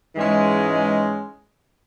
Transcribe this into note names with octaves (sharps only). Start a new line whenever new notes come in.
G#2 E3 G#3 C#4